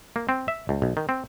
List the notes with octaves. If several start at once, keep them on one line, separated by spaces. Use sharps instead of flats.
A#3
C4
E5
C#2
B1
D#3
C4